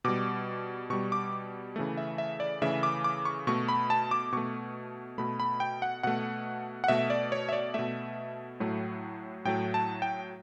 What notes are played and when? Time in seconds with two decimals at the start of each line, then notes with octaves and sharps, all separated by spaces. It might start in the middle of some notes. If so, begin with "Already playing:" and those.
0.04 B2 G3 D6
0.90 B2 G3 C#6
1.12 D6
1.76 C#3 E3 A3
1.97 E5
2.18 E5
2.40 D5
2.61 C#3 E3 A3 E5
2.83 D6
3.04 D6
3.25 C#6
3.47 B2 A3 C#6
3.69 B5
3.90 A5
4.11 D6
4.32 B2 A3 C#6
5.18 B2 A3 B5
5.40 B5
5.60 G5
5.82 F#5
6.03 B2 A3 F#5
6.84 F#5
6.88 B2 A3 E5
7.10 D5
7.32 C#5
7.49 E5
7.53 D5
7.74 B2 A3 E5
8.60 A2 F#3 A3
9.45 A2 F#3 A3 G5
9.74 A5
10.02 G5